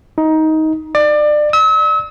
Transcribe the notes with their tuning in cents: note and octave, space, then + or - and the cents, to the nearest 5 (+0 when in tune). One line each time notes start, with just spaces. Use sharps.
D#4 +15
D5 +25
E6 -40